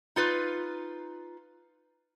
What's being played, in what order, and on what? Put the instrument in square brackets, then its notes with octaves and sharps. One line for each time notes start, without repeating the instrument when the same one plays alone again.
[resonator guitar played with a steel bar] D#4 F4 B4